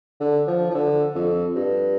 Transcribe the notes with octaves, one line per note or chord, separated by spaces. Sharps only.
D3
F3
F3
D3
F2
G2